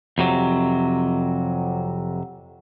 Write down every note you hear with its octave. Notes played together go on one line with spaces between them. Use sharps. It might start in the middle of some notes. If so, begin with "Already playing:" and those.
F2 C3 F#3